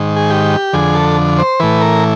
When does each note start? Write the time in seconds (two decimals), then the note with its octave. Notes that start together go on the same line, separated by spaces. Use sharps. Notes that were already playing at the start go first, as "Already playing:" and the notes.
Already playing: G#2 D#3
0.16 G#4
0.30 G4
0.73 F2 D3 G#4
0.95 A4
1.38 C5
1.60 A2 E3 B4
1.81 A#4